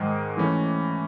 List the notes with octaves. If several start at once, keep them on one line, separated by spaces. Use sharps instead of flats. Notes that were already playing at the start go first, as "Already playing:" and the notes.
Already playing: G#2 D#3 G#3
E3 A3 C#4